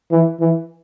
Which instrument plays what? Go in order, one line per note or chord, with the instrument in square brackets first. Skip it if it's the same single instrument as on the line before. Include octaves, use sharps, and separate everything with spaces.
[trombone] E3
E3